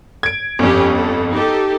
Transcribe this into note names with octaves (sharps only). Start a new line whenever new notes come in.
G#6 D7
G1 F2 C#4 G4
A4
D#4 G4 A4